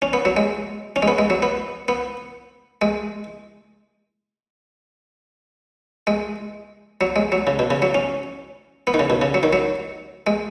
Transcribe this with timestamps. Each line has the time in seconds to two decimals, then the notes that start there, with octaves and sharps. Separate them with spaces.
0.02 C#4
0.13 B3
0.25 F#3
0.37 G#3
0.96 C#4
1.02 G#3
1.08 B3
1.18 G#3
1.30 F#3
1.42 B3
1.88 B3
2.82 G#3
6.07 G#3
7.01 F#3
7.16 G#3
7.32 F#3
7.47 C#3
7.59 B2
7.71 C#3
7.82 F#3
7.95 C#4
8.87 B3
8.94 D#3
8.99 C#3
9.10 B2
9.22 C#3
9.34 F#3
9.43 D#3
9.53 F#3
10.27 G#3